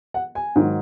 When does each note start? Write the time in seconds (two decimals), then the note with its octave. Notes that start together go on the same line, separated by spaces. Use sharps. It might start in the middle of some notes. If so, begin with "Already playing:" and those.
0.14 F#5
0.35 G#5
0.56 G#2 D#3 F#3